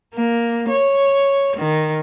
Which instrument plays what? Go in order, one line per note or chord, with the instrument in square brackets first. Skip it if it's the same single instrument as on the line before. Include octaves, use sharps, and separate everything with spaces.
[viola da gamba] A#3
C#5
D#3